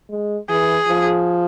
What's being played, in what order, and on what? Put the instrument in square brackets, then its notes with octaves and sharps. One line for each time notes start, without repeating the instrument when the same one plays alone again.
[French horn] G#3
[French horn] E3 [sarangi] G#4
[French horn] F3